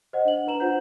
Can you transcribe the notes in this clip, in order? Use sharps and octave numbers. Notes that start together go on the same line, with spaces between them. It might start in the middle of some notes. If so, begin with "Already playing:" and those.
C5 D#5 F#5
D4 F#7
D4 B4 A#5 E7 F#7
F4 C5 F#5 G6